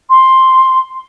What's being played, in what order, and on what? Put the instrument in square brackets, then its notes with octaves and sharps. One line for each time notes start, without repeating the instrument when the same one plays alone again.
[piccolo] C6